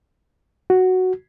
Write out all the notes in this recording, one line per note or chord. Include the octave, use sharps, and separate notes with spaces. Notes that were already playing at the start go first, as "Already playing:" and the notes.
F#4